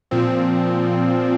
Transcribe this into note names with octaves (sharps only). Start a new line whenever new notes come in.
A#2 F3 C4